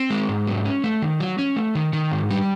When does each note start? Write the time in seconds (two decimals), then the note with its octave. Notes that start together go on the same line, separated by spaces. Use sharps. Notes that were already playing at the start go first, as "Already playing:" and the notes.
Already playing: C4
0.10 G#3
0.29 G#2
0.47 F#3
0.65 C#4
0.84 A3
1.02 D#3
1.20 F#3
1.39 C#4
1.56 A3
1.75 D#3
1.93 D#3
2.12 G#2
2.31 G3